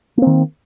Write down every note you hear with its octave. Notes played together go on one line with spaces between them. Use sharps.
D#3 A#3 C4